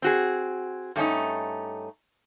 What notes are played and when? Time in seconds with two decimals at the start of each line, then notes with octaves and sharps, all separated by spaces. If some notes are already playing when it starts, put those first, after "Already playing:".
0.02 C4 F#4 G#4
0.96 G2 A3 C#4 D#4